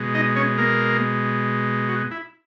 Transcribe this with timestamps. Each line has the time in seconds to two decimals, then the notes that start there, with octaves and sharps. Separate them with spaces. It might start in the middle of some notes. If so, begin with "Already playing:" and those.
Already playing: B2 G#3
0.15 D#4 D#5
0.36 C#4 C#5
0.58 A#3 A#4
1.89 F#4
2.11 E4